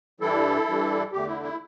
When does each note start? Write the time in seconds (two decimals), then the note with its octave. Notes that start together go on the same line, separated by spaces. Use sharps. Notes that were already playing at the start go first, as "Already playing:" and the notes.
0.20 G2 E3 G3 E4 A4
0.66 G2 E3 G3
1.12 E2 D3 A3 G4
1.27 E4
1.43 E4